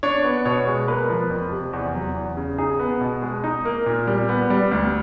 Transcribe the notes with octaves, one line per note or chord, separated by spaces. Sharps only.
D4 C#5
B3
B2 C#5
G#3
A#3 B4
F3
F2
C3
E2
F#3
E2
C#3
D#4 G#4
B3
B2
G#3
D#4
A#3
A#2
G3
B3
G3
D2